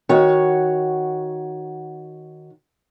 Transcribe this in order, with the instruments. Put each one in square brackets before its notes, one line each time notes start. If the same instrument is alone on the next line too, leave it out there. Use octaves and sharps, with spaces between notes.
[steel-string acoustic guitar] D#3 F#4 C#5 F#5